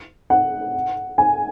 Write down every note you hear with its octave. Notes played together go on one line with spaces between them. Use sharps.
F#5
G#5